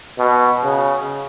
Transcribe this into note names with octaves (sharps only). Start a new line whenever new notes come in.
B2
C#3